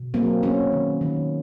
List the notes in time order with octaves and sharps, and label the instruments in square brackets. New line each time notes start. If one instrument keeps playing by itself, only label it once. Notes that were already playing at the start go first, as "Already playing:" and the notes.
Already playing: [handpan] B2
F#3 A#3 C4
A#3 B3 C#4
D#3
D#3